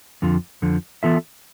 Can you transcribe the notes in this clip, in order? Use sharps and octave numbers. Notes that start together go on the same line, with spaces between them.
F2 D3 F3
F2 D3 F3
E3 B3 F4 A4 E5